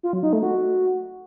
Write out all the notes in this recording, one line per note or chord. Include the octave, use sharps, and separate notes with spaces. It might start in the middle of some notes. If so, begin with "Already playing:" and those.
F4
F#3
D#4
A3
F#4